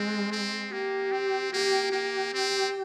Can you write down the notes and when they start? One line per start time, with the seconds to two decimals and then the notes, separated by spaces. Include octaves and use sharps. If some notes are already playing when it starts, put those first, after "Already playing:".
Already playing: G#3 C4
0.32 C4
0.72 A#3 G4
1.12 C4
1.53 A#3 G4
1.92 A#3 G4
2.33 C4